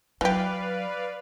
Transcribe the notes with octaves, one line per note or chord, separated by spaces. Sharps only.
E3 F#3 G4 B4 D5 F5